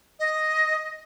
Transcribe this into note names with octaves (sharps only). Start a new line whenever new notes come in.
D#5